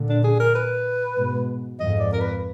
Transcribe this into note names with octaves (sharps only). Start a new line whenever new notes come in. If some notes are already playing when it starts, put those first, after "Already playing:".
Already playing: A#2 D3
D4
G#4
A#4
B4
G#2 B2
F2 G#2 D#5
D5
A#4
B4